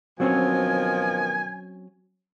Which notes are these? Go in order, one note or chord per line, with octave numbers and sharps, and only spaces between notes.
B2 D#3 F3 F#3 C4 C#4 G#5